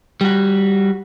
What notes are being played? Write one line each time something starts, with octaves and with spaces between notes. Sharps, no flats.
G3 F#4